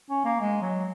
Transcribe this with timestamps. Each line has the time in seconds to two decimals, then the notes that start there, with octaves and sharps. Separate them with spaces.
0.10 C#4
0.25 A#3
0.41 G#3
0.62 F#3